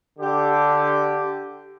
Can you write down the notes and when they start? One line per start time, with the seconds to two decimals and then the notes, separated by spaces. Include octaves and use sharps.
0.19 D3 G4